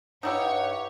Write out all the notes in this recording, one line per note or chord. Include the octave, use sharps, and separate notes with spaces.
G2 D#4 E4 G4 C#5 F#5